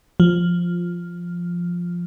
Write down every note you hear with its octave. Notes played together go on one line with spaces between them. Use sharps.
F3